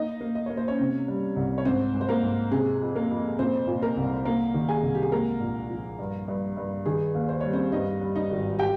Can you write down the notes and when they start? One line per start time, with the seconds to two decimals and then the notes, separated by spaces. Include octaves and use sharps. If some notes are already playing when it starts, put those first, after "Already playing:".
Already playing: A#3 D#4 D#5
0.21 A#3
0.35 D#5
0.46 A#3 C#5
0.57 C5
0.68 C#4 C#5
0.79 C3
1.08 G3
1.36 C2
1.58 C#5
1.65 G#2 C4 C5
1.94 G#2
2.01 C5
2.09 A#3 A#4
2.23 G#2
2.52 C3 G#4
2.81 F2
2.95 A#3 A#4
3.10 F2
3.39 A#2 C4 C5
3.67 A#2
3.82 A#3 A#4
3.97 C2
4.25 A#3 A#4
4.54 D#3
4.69 G#4 G#5
4.83 C2
4.95 G4
5.03 G#4
5.12 G#3 A#3 A#4
5.41 A#1
5.70 F3
5.99 G2
6.28 G2
6.57 G2
6.86 D#3 G#4
7.15 D#2
7.29 C5
7.41 G3 C#5
7.53 C4 C5
7.72 G2 D#4 D#5
8.01 G3
8.16 D#4 D#5
8.31 G#1
8.59 G4 G5